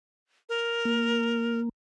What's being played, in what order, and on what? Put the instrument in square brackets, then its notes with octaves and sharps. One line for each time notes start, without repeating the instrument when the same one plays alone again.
[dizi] A#4
[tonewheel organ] A#3